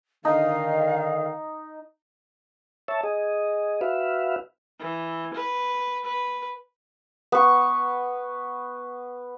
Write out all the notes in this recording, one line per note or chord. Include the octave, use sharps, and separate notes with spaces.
D3 D#3 D#4 F5
C#5 E5 A5
G#4 D#5
F#4 B4 E5 F5
E3
B4
B4
B3 C#6